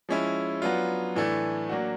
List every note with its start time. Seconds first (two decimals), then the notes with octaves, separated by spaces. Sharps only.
0.09 F3 G#3 C#4 E4
0.62 F#3 B3 D4 F4
1.16 A2 E3 A3 D4
1.69 F#3 A#3 D4 F#4